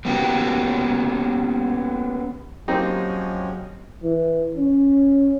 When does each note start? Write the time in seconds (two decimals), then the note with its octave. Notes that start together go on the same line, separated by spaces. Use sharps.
0.05 A#3 B3 C#4 F#4 G4
2.68 F3 F#3 G#3 A#3 C4 C#4 D#4 G4
4.03 E3
4.56 C#4